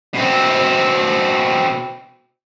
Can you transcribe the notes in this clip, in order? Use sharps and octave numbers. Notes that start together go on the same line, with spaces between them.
B2 C4